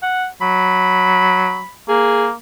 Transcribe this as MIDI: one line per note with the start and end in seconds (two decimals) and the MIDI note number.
0.02 0.27 78
0.41 1.62 54
0.41 1.74 83
1.89 2.34 58
1.89 2.27 68